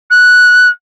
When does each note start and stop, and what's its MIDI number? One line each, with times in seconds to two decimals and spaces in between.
0.10 0.70 90